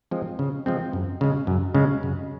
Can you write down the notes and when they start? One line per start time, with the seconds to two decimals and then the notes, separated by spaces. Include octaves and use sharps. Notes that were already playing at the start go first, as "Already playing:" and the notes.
0.11 F3 G#3 C4
0.39 C#3
0.66 F3 G#3 C4
0.93 F#2
1.21 C#3 G#3
1.47 F#2
1.74 C#3 G#3
2.03 F#2